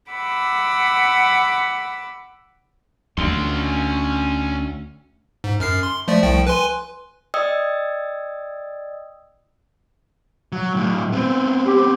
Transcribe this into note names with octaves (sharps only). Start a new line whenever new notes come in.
F#5 B5 D6 E6
D2 C#4 C6
G#2
F#2 F6 C7
C6
F3 A3 D5
C2 F3 G5
B4 G#5 C6
D5 D#5 G5 D#6 E6
F#3
A2 F#3
B3 C4
G4